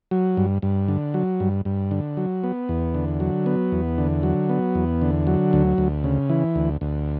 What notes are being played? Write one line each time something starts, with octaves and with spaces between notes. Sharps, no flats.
F#3
G2
G2
D3
F#3
G2
G2
D3
F#3
B3
E2
D3
F#3
B3
E2
D3
F#3
B3
E2
D3
F#3
D2
D2
C#3
E3
D2
D2